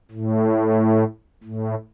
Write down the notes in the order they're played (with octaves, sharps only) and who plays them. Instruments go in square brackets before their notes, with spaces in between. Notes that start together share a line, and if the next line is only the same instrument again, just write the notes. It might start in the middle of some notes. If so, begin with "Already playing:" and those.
[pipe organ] A2
A2